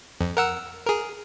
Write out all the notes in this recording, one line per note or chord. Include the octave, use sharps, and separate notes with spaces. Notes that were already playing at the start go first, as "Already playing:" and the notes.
F2
A#4 F#5 E6
G#4 A#4